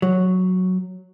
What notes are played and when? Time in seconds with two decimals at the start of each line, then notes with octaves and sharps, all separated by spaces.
0.02 F#3